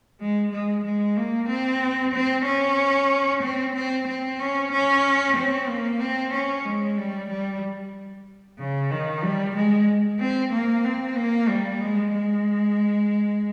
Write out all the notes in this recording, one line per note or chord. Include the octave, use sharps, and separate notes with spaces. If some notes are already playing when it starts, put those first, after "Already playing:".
G#3
G#3
G#3
A#3
C4
C4
C#4
C4
C4
C4
C#4
C#4
C4
A#3
C4
C#4
G#3
G3
G3
C#3
D#3
G3
G#3
C4
A#3
C4
A#3
G3
G#3
G#3